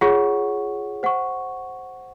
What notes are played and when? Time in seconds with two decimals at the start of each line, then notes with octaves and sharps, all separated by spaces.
0.01 F4 G#4 C#5 F#5 C#6
1.03 C5 F#5 C#6